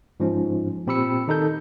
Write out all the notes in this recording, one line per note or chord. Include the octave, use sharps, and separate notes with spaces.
G#2 F3 C#4
A#2 C4 G4 B5 E6 C#7
D#3 D#4 A4 G6